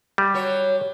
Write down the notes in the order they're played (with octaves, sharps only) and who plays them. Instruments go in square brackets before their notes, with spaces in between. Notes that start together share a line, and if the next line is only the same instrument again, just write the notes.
[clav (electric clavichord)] G3
[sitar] F#3 C#5